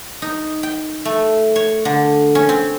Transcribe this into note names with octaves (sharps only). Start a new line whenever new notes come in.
D#4
G5
A3
C#5
D3
C#4
C4